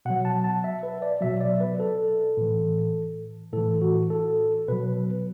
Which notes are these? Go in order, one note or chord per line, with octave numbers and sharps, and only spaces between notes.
B2 F#3 F#5
A5
A5
E5
B4
D5
B2 F#3 E5
D5
B4
A4
A2 E3
A2 E3 A4
F#4
A4
B2 F#3 B4